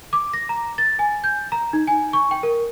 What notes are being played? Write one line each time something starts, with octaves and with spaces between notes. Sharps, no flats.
D6
A#6
A#5
A6
G#5
G6
A#5
D#4
G#5
C#6
G5
A#4